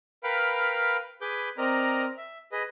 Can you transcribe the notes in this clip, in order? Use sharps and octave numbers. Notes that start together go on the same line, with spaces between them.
A#4 B4 F5 G5 B5
G#4 B4 B5 D6 G6
C4 A#4 D5 D#5 A#5
E5
G#4 B4 D#5